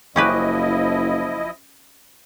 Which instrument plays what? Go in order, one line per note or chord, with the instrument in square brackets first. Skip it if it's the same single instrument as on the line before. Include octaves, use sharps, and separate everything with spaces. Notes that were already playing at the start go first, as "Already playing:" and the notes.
[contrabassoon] F#1 [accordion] F3 E4 D#5 [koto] C#4 G4 B4